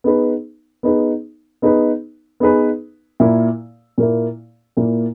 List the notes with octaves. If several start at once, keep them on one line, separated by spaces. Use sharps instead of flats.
B3 D#4 G#4 B4
B3 D#4 G#4 B4
B3 D#4 G#4 B4
B3 D#4 G#4 B4
A#2 A#3 E4
A#2 A#3 E4
A#2 A#3 E4